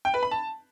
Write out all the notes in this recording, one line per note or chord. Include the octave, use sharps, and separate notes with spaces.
G5
B4
B5
A5